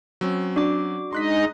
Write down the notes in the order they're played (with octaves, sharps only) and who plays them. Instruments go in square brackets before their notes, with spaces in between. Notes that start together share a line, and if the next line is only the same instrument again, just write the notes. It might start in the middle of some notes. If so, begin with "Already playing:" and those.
[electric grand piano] F#3 C4 C#4
[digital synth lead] D4 [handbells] F#4 D6
[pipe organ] G#3 D#4 D#5 [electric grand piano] C6 F#6 B6